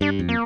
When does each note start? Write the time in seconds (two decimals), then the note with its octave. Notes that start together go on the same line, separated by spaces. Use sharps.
0.01 G2 D4
0.19 F2
0.29 A#3